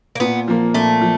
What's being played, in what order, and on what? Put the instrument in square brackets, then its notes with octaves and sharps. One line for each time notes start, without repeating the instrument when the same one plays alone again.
[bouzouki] A#3
[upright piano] A#2 [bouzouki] B3
[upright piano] F3 A#3
[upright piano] A#2 [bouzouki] A3
[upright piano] F3